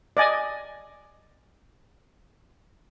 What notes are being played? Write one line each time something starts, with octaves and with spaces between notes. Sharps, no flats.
D5 D#5 G#5